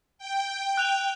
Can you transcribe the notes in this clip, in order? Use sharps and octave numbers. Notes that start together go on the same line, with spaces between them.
G5
F#6 F7